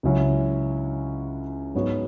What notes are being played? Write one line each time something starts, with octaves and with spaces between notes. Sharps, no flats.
C#2 C#3 F#3 C#4 E4
G#2 F#3 B3 F#4 C#5